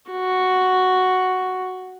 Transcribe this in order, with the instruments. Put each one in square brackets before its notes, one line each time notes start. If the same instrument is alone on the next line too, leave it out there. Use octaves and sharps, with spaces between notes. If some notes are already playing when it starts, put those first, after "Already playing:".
[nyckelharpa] F#4